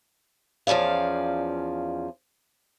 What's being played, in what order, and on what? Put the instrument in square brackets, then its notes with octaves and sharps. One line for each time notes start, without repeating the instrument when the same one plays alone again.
[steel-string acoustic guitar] E2 F3 C#4 D5 F5